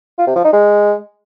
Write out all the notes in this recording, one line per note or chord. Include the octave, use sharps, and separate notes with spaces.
F4
C3
F3
D#4
G#3